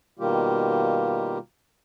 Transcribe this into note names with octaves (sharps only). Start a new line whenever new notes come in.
B2 D#3 G3 A#3 F4 G4